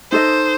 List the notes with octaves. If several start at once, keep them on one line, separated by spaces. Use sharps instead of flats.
D#4 A4 C5 D#5